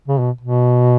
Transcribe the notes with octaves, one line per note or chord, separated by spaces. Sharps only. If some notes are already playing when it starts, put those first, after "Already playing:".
C#3
B2
B2